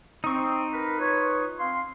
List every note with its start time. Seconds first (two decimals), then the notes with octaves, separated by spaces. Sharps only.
0.24 C4 D#4 C#6
0.72 A#4 B4
0.99 F4 B4 C#5
1.58 C4 F5 C6